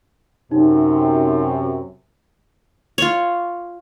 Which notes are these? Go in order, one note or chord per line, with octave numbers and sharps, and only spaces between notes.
F#2 C3 D#4
F4 C#5